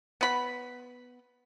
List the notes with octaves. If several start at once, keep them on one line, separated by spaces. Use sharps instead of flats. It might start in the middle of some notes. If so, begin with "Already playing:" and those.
B3 B5